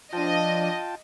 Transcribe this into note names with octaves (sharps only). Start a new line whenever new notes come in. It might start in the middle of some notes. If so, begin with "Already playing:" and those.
F3 D4 F4 D#5 G5 A5